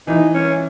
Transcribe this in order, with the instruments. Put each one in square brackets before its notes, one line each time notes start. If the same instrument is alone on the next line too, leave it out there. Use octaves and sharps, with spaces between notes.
[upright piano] E3 [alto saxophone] D#4
[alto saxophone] C#4